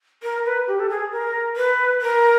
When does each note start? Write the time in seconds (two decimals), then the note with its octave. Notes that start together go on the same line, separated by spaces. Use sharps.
0.23 A#4
0.45 B4
0.67 G4
0.80 A4
0.90 G#4
1.12 A#4
1.56 B4
2.02 A#4